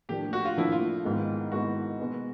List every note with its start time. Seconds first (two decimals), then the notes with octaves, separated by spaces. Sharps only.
0.09 A2 F3 A#3 D4 G4
0.33 F#4
0.45 F4
0.56 A2 F3 A#3 D4 E4
0.72 F4
1.04 G#2 D#3 G#3 B3 E4
1.52 G#2 D#3 G#3 B3 E4 F#4
2.00 B2 G#3 B3